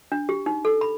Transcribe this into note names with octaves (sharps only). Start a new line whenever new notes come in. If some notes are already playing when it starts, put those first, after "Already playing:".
D4
G4
D#4
A4
B5